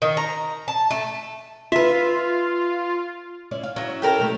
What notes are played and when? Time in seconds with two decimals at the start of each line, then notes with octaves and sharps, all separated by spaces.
0.02 D#3
0.17 A#5
0.68 A5
0.91 A3
1.72 F4 B4 E5
3.51 C#4 E4 D5
3.63 F5
3.76 F#3 C#4 E4
4.02 G4 A4 A#4
4.19 B2 F#3 A3